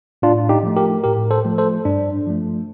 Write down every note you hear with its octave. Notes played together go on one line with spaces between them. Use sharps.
A2 D4 F4
D#4 G4
F3 A3
G4 A#4
A2 G4 A#4
A4 C5
F3 A3
A4 C5
G2 D4
F3 A3